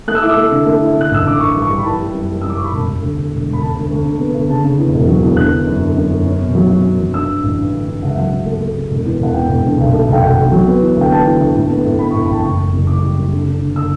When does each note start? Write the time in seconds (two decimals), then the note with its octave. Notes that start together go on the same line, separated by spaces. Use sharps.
0.07 A3 F#6
0.15 E6
0.22 E4 D6
0.29 E6
0.37 A3
0.51 D3
0.66 A3
0.81 E4
0.96 D3 F#6
1.11 A1 E6
1.25 D3 D6
1.40 G2 C#6
1.54 G3
1.62 C#6
1.69 G3
1.78 B5
1.84 E3 A5
1.99 G3
2.13 F#2
2.28 G3
2.42 F#2 E6
2.50 D6
2.57 G3 C#6
2.64 B5
2.72 E1 A5
2.87 E1
3.01 D2
3.16 D3
3.31 E1
3.46 E1
3.53 B5
3.61 D2 A5
3.75 D2
3.91 D2
4.05 D3
4.19 B3
4.34 D2
4.48 C#3 A5
4.63 C#3
4.78 E2
4.94 E1
5.07 F#3
5.23 E2
5.37 D3 F#6
5.51 D3
5.67 F#2
5.81 D3
5.97 F#2
6.11 F#2
6.25 C#4
6.40 B2
6.55 F#3
6.69 F#3
6.84 C#4
6.99 F#3
7.14 G2 E6
7.28 G2
7.43 A1
7.58 G2
7.72 D3
7.88 G2
8.01 C#2 F#5
8.10 E5
8.17 F#3 F#5
8.32 C#3
8.45 A3
8.61 A3
8.76 C#3
8.90 E1
9.05 E2
9.20 E1 F#5
9.34 E2 G5
9.49 E1
9.64 D3
9.78 B1
9.93 A3
10.08 B1 G5
10.23 B1 F#5
10.38 B1
10.52 F#3
10.67 B3
10.81 E3
10.96 D2 G5
11.10 B3 A5
11.25 E3
11.40 D2
11.55 A2
11.69 B3
11.85 A2
11.99 B3 B5
12.11 C#6
12.13 A2
12.21 B5
12.28 A1 G5
12.32 A5
12.43 F#1 C#6
12.57 F#2
12.73 F#1
12.87 F#2 D6
13.03 G3
13.17 F#1
13.32 D3
13.47 D3
13.61 G1
13.76 E6